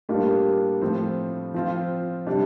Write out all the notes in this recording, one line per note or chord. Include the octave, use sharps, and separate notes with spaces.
A2 G3 A#3 D4 F4
A2 F3 C4
F3 C4 F4
C3 G3 D4